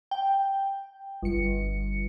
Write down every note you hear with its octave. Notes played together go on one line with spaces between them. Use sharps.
G5
G1 C#7